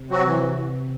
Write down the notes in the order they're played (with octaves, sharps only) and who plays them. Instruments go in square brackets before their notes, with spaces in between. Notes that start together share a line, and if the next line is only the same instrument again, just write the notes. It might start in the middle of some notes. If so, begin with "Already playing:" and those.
Already playing: [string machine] C3
[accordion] F#3 C4 F#4
E3